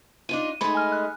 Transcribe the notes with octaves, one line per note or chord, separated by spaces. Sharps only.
D4 D#4 F4 D#7
G#3 A3 D#4 B5
G#5 F6
F#6